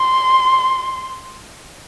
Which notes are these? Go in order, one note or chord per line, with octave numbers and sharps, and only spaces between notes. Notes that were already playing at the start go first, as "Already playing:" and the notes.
Already playing: C6